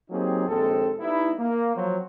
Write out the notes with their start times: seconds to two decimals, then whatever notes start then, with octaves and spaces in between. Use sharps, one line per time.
0.10 F#3 A#3 C4 D#4 G4 G#4
0.48 A#1 D#2 G#3 C4 A4
1.00 G3 B3 D#4 E4
1.38 A#3
1.75 F3 F#3 C4